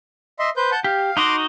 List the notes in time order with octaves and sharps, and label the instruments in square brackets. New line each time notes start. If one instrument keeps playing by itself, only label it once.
[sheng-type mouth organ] D#5 E5 C6
B4 C5 G6
F#5 A5 G6
[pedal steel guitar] G4 [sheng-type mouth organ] F5
[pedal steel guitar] D#4 F#4 D#5 [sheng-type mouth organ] C6 D6